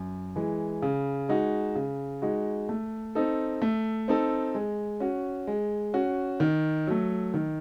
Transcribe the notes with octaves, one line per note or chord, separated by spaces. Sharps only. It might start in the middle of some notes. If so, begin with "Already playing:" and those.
Already playing: F#2
E3 G#3
C#3
G#3 D#4 F#4
C#3
G#3 D#4 F#4
A3
C4 D#4 A4
A3
C4 D#4 A4
G#3
C#4 F#4
G#3
C#4 F#4
D#3
F#3 A3
D#3